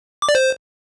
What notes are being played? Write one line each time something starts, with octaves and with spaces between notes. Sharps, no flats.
D6
D5
C5